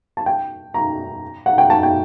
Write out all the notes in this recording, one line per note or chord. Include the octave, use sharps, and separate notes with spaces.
A5
G5
A#5
F#5
G5
A5
G5